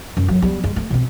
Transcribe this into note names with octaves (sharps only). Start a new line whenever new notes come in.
F#2
F#3
G3 B3
G#3
A3
B2 C4